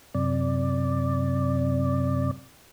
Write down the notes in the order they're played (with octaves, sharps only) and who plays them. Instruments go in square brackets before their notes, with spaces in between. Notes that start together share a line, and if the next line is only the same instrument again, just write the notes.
[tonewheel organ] F#2 C3 D5